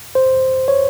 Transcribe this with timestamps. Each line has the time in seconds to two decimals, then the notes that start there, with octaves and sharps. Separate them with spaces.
0.15 C5
0.68 C#5